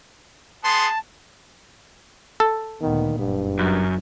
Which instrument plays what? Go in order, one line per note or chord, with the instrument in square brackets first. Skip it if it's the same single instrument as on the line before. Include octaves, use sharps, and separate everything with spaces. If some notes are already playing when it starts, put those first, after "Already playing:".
[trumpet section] B3 G#4 C6 [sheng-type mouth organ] A5
[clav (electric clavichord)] A4
[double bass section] D2 A#2 B3 [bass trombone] D#3
[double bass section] F#1 [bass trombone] G2
[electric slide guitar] F#2